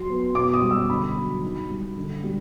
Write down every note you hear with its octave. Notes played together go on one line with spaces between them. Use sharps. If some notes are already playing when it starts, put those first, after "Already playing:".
Already playing: F#3 C6
B3
B2 D6
D#6
G3
E6
D3 B5
F#3
D#3
G3
D3
G3